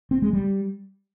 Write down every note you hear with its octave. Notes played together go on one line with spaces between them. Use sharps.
C4
G#3
G3